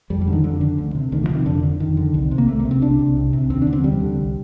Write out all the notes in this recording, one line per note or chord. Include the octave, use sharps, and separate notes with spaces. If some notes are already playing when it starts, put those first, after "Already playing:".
F2 G3
G3
D3
D#3
F2 D3
D3
D2
C3
D2 D#3
F3
C3
D#3
F2 D3
D3
F2 D#3
D3
C2
C3
A#3
C2 A3
A#3
C3
C4
C2 D4
C3
C2
C3
D#2 C4
D4
D3
C4
F3
D#2 G3
D3
C2